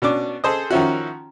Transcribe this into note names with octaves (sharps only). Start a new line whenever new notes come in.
B2 C#4 D4 D6
G#4 A4 C5 D#5
D#3 F3 C#4 E4 F#4